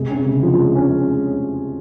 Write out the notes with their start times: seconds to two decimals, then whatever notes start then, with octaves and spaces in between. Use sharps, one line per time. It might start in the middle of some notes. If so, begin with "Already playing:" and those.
Already playing: C3 G#3
0.10 C#4
0.26 C#3
0.43 F3
0.59 G#3
0.75 C#4